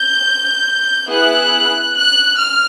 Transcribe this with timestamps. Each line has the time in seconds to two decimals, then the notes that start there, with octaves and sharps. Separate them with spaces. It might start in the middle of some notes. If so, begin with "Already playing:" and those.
Already playing: G6
1.08 B3 E4 G#4 F#6
1.94 F#6
2.37 F6